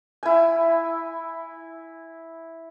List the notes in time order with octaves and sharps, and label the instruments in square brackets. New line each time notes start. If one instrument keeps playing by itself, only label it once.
[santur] E4 G#5